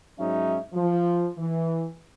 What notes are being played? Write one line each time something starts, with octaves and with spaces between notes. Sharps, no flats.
G#2 F#3 C#4 D#4 E5
F3
E3